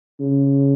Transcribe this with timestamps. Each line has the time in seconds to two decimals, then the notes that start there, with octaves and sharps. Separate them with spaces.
0.20 C#3